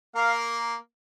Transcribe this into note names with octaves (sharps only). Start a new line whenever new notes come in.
A#3 A#4 F5